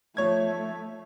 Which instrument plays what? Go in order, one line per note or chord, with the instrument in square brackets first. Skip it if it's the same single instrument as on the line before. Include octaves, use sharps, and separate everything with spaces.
[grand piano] F3 C#5 G#6 [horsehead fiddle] A3